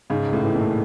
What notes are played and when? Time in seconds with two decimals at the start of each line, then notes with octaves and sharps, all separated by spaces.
0.10 G#2 C#3
0.27 C#2
0.33 A2
0.44 E3
0.55 A#2
0.61 A3